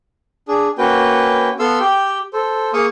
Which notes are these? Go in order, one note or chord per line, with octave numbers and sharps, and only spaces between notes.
D4 G#4
A#3 C#4 F#4 B4 G5
B3 A4 F5 C6 E6
G4 G5
A4 C5
A#3 G#4 F5 C#6 D#6